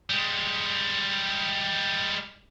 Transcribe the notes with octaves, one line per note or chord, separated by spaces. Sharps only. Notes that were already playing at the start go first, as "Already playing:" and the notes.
G3 G#3